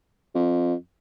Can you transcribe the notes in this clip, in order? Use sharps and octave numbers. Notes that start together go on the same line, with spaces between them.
F2